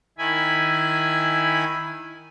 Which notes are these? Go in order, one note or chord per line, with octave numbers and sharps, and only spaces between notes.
D#3 E4 G#5 B5